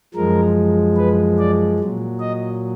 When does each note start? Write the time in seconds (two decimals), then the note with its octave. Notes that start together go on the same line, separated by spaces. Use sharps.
0.15 F#2 F3 G#3 A#4
0.96 B4
1.39 D5
1.79 A#2 F#3
2.20 D#5